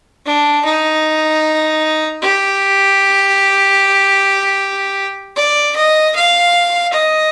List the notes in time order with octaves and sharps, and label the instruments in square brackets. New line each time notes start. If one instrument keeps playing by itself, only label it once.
[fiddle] D4
D#4
G4
D5
D#5
F5
D#5